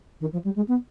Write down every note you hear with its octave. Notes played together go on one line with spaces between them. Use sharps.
D#3
F3
G3
G#3
B3